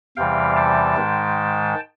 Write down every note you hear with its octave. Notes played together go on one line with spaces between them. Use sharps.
E2 C3 E3 G3 F5 G5
G5 A5
G#2 D#3 G#3